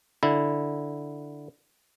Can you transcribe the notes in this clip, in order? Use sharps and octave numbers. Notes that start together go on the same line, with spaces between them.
D3 E4